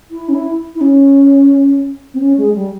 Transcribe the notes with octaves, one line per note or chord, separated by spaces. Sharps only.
E4
C#4
E4
E4
C#4
C4
C#4
G#3
G3